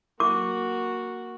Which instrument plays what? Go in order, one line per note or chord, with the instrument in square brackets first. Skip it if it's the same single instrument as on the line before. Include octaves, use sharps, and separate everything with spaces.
[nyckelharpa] A#3 F#4 [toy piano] D6